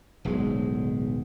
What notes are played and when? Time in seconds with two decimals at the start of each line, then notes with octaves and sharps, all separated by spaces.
0.25 D1 B1 G#2 G#3